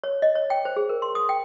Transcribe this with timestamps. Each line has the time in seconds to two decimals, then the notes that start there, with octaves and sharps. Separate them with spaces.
0.04 C#5
0.22 D#5
0.35 C#5
0.50 G5
0.65 C5
0.76 G#4
0.89 A#4
1.02 C6
1.15 D#6
1.29 G5